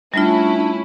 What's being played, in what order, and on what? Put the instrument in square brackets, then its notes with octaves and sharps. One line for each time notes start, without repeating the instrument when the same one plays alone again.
[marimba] G3 A3 F4 [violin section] C#4 E4 [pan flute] D4